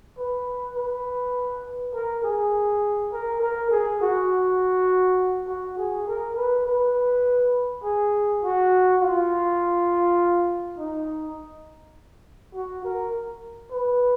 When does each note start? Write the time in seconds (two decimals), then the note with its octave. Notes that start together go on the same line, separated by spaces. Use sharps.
0.18 B4
0.77 B4
1.94 A#4
2.24 G#4
3.13 A#4
3.42 A#4
3.71 G#4
4.01 F#4
5.48 F#4
5.77 G#4
6.07 A#4
6.37 B4
6.66 B4
7.83 G#4
8.43 F#4
9.01 F4
10.78 D#4
12.55 F#4
12.84 A#4
13.72 B4